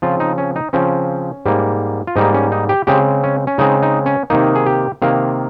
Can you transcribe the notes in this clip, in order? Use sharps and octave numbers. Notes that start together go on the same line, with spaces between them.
C#3 F3 C4 F4
D#4
C#4
D#4
C#3 F3 C4 C#4
G#2 G3 A#3
F4
G#2 G3 A#3 D#4
C#4
D#4
G4
C#3 G#3 C4 G4
C#4
C#4
C#3 G#3 C4 D#4
D#4
C#4
C3 D#3 A#3 D#4
G#4
G4
C3 D#3 A#3 F5